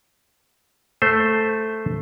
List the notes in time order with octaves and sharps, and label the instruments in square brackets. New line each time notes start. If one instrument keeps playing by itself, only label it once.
[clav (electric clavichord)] A3 C5